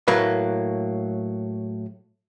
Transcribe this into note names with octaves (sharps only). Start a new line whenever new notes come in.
A2 F#3 A#3 B4